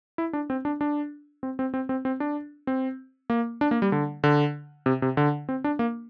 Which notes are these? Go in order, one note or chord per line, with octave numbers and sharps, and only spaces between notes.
E4
D4
C4
D4
D4
C4
C4
C4
C4
C4
D4
C4
A#3
D4
A#3
G3
D3
D3
C3
C3
D3
C4
D4
A#3